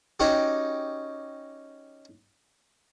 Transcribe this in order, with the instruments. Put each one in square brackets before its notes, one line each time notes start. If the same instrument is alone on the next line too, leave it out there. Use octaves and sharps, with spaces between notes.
[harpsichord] C#4 D#4 F#4 G4